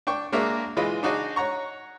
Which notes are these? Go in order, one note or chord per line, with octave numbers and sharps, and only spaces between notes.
D4 G5 C#6
G#3 A#3 D4 F#4 A#4 E5
E3 G#3 F4 D#5 B5
D4 D#4 F#4 G#4 D5 D#5
C#5 F#5 A#5 C#6